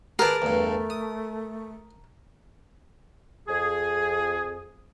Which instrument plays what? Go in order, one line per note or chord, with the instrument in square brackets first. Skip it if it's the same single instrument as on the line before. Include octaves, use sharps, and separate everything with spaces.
[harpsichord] G#4 B4 D5 [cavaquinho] A#4 A5
[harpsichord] E2 G2 [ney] A3
[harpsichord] D#6
[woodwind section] F2 G#4